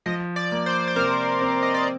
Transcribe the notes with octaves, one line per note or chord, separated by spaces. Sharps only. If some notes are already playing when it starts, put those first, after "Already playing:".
F3 D#5
D5
A#3
C5
C5
C3 A#4
C4
D#5
D5